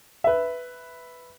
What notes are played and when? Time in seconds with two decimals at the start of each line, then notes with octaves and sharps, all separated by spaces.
0.24 B4 E5